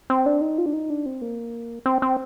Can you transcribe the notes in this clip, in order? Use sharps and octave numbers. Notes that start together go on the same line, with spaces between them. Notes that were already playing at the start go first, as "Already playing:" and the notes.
C4
D4
D#4
F4
D4
D#4
D4
C4
A#3
C4
C4